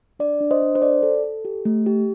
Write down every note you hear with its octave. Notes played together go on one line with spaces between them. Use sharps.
D4 D5
D4
C5 D#5
D4
C5
A4 D5
A4
A4
G4
A3
G4